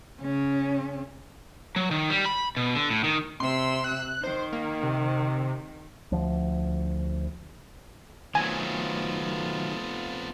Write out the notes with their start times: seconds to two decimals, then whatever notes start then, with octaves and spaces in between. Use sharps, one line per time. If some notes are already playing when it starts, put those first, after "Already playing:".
0.21 C#3 C#4
1.76 F#3
1.91 D#3
2.10 G3
2.25 B5
2.57 B2
2.75 D3
2.90 A2
3.04 D#3
3.40 C3 C6 E6
3.84 F#6
4.24 D#3 C5
4.53 A#3
4.83 C3
6.12 D2 F3
8.35 D#3 F#3 A3 B3 C4 F4 G#5 A5